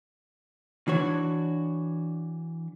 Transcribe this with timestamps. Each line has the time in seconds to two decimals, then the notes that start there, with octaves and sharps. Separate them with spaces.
0.88 E3 D4 F#4 C#5